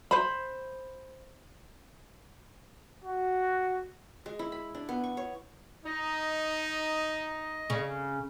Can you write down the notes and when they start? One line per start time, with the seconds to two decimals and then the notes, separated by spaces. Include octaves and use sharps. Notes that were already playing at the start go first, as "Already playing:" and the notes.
0.11 C5 B5
3.04 F#4
4.26 G#3
4.39 E4
4.52 B5
4.75 D4
4.89 B3
5.04 C#6
5.17 C#5
5.86 D#4 D#5
7.70 C#3